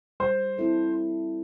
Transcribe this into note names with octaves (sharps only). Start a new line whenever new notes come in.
G3 C5
C4 E4 A4